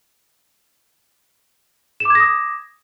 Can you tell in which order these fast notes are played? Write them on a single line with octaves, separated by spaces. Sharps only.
E7 D6 G#6 A#6 D#6